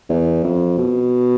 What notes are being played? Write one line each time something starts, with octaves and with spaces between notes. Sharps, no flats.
E2
F2
B2